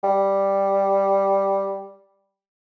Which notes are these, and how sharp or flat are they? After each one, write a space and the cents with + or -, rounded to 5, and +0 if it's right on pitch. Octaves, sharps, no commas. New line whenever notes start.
G3 +0